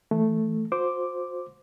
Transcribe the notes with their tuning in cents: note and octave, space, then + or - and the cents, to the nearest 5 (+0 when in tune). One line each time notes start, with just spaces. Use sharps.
E3 +0 A3 +0
F#4 -45 C5 +0 D6 +0